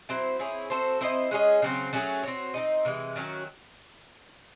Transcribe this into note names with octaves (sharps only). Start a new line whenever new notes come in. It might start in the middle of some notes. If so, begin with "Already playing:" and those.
F#3 C4 E4 C5
C4 E4 G#4 C#5
C4 F#4 A4 C5
C4 E4 C5 D#5
G#3 C#4 G#4 D#5
C#3 F#3 C4
F#3 A3 C#4 G#4
C4 F#4 C#5
C4 D#4 A4 D#5
C3 E3 G#3
D#3 F#3 C#4 F#4